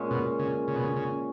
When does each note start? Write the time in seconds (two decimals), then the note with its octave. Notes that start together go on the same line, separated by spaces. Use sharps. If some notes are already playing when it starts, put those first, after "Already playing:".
Already playing: A#2 G#3 C#4
0.11 B2
0.39 C#3
0.68 C#3
0.76 B2
0.83 C#3
0.96 C#3